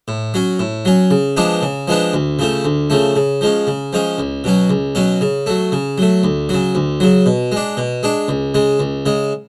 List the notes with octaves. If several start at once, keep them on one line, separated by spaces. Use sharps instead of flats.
A2
F#3 C#4
A2
F#3 C#4
C#3
F3 G#3 B3 D4
C#3
F3 G#3 B3 D4
D2
C#3 F3 A3
D2
C#3 F3 A3
C#3
F3 G#3 C#4
C#3
F3 G#3 C#4
C#2
B2 F#3 C#4
C#2
B2 F#3 C#4
C#3
F#3 A3
C#3
F#3 A3
D2
C#3 F#3
D2
C#3 F#3
B2
G#3 D4
B2
G#3 D4
C#2
C#3 G#3
C#2
C#3 G#3